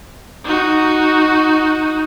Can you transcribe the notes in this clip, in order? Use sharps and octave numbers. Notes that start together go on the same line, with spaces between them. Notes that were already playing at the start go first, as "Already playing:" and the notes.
D#4 F#4